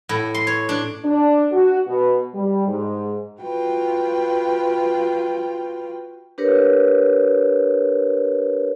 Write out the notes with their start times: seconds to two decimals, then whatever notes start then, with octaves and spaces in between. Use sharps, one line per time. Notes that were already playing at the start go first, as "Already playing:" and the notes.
0.09 A2
0.34 C6
0.47 C#5
0.69 D4
1.05 D4
1.51 F#4
1.86 B2
2.33 G3
2.67 G#2
3.42 F4 F#4 B4 G5
6.38 D4 G4 A#4 B4 C#5